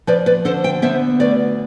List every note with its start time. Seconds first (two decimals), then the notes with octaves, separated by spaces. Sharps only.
0.07 F3 B4 D5
0.26 B4 D5
0.45 D3 A4 C5
0.64 E5 G5
0.82 B3 C5 E5
1.20 D2 B4 D5